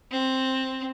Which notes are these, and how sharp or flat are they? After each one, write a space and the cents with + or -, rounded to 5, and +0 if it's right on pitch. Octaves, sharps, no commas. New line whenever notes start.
C4 +5